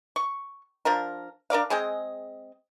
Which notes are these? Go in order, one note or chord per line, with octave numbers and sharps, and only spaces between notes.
C#6
F3 D4 A#4
D4 A#4 D5 F5
G#3 C4 G#4 D#5